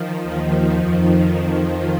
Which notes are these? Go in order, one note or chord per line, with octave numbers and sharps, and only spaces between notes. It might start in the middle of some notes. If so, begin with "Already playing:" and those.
Already playing: D#3 F3
D#2 D#3
F2 D#3